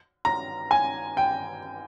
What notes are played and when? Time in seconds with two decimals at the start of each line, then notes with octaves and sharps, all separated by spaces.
0.25 A#5
0.71 G#5
1.17 G5